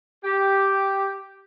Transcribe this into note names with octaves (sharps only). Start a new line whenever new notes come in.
G4